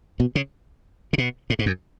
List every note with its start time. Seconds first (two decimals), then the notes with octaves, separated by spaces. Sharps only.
0.20 B2
0.35 C#3
1.13 C#3
1.18 B2
1.50 A2
1.59 G#2
1.66 F#2